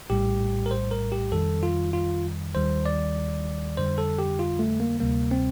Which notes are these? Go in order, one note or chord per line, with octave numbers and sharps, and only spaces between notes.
A#1 A2 G3 G4
A#4
C5
A#4
G4
F2 D#3 G3 A4
F4
F4
D#2 D#3 G3 C5
D5
F2 D3 G3 C5
A4
G4
F4
A3
A#3
D2 C3 G3 A#3
C4